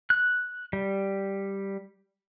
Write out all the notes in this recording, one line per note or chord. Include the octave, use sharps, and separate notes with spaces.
F#6
G3